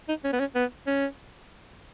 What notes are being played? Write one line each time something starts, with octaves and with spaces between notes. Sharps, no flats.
D#4
C#4
B3
C#4
B3
C#4